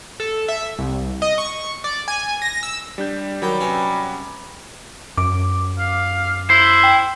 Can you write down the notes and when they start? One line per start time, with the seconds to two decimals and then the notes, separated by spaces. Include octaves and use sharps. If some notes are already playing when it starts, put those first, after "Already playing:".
0.20 A4
0.48 E5
0.78 C2
1.22 D#5
1.38 C#6
1.84 D5
2.08 G#5
2.42 A#6
2.63 E6
2.98 G3 D4 G6
3.42 D#3 F#3 G3 G5
3.60 C3 C#4 B4
5.17 F#2 D6
5.79 F5
6.50 E4 C5
6.84 G5